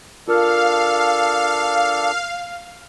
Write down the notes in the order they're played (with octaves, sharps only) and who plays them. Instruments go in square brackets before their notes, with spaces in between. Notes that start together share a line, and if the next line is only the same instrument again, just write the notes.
[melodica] D4 A4 [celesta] F4 A#4 F6 [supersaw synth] F5